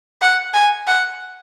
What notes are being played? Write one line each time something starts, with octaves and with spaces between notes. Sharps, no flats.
F#5
G#5
F#5